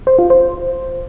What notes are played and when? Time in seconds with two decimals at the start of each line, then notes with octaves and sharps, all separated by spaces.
0.07 C5
0.19 F4
0.30 C5